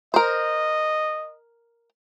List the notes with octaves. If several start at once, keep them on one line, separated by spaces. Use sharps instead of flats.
A#4 C5 D#5